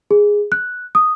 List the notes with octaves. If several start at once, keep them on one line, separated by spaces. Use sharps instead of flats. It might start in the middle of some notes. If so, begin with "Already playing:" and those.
G#4
F#6
D#6